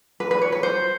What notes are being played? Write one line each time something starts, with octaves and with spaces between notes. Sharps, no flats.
B4
B4
C#5
B4
C5